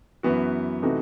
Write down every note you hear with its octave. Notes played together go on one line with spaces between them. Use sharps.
F#2 E3 B3 F#4
C3 E3 A3 D#4 F#4